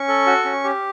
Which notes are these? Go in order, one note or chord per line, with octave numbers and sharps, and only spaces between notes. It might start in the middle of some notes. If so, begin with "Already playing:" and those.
Already playing: C#4 C#6
A4
F#4
C#4
G4